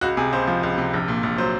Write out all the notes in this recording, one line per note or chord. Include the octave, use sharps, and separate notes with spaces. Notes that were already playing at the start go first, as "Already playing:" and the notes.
C#2 F#4
C3 G#4
C#2 C5
F3
C#2
C3
A#1
A#2
A#1
F#3 C5